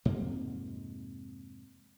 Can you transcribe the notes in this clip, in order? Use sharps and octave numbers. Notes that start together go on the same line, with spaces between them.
F2 G#2 C3 A#3